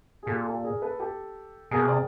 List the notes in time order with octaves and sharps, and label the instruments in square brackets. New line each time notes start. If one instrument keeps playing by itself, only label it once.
[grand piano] G#4
[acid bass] A#2 [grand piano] G4 A4
[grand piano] G4 A4
G#4 A#4
A4 B4
G4 A4
[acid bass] B2 [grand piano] G#4 A#4
[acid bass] C3 [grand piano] D5